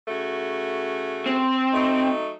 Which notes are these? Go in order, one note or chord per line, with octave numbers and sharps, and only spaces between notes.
C#3 A3 F#4
C4
F#3 A3 D#4